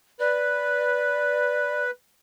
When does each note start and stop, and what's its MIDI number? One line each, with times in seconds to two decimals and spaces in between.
0.20 1.91 71
0.20 1.83 74